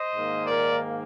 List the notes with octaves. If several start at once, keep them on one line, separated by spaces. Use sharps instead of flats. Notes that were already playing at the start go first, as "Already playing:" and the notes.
Already playing: C5 D#5
G#2 D#3 A#3
A#4 D5